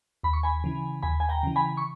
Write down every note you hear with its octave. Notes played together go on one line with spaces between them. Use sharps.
D#2 B5
C#6
G#5 B5
C#3 E3
D#2 G#5 B5
G#5
G5 A#5
C#3 E3
G#5 B5
C#6